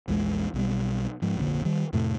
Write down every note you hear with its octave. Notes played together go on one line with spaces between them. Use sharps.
A#1 E2 D3 G#3
B1 B2 G3
G#2 F3
F1 A#1 A#2 D3
D#3 G3
F2 A2 C3 A3